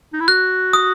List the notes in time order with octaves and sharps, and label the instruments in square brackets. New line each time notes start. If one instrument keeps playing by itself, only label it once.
[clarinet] D#4
E4
[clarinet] F#4 [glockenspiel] F#6
[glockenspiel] D#6